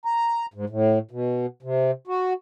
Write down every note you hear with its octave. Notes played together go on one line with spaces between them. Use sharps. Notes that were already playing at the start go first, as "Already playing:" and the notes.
A#5
G#2
A2
B2
C3
F#4